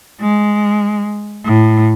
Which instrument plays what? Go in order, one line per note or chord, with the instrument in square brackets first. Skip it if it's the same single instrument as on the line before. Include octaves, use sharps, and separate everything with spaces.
[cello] G#3
A2